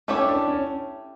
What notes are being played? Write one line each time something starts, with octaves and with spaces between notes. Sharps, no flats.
A3 C#4 E4 G4 C#5
D4
C#4